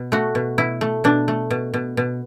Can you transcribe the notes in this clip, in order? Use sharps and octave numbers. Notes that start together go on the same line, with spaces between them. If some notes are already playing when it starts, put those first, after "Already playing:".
Already playing: B2
A3 F#4
B2
B2 E4
A3
B2 D4
A3
B2
B2
B2